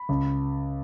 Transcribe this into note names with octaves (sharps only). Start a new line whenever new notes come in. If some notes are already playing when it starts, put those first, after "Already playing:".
Already playing: B5
C#2